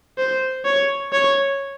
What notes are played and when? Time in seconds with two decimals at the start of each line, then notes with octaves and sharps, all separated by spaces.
0.18 C5
0.65 C#5
1.13 C#5